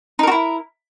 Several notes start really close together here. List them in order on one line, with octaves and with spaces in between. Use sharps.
D#4 A#4 F#4 E4